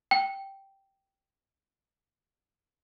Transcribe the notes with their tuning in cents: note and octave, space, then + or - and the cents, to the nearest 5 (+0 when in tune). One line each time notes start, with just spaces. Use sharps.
G5 -5